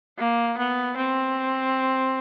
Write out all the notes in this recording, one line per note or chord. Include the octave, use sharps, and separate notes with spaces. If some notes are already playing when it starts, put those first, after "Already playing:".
A#3
B3
C4